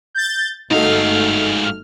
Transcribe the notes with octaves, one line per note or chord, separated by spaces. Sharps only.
G6 A6
G1 G#2 A3 D#4 F#4 A4 F5 F6